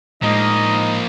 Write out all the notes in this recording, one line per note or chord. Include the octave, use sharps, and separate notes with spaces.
A2 F3 G#3 A#3 D#4 D#5